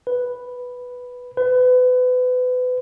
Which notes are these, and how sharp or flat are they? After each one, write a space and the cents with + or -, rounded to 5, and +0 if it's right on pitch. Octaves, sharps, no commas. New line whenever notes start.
B4 +0
B4 +30